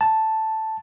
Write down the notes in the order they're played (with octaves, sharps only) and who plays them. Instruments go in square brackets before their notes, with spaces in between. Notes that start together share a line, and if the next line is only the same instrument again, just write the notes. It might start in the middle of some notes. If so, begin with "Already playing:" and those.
[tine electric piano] A5